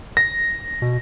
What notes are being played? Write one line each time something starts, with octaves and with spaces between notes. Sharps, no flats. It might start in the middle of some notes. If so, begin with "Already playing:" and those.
A#6
B2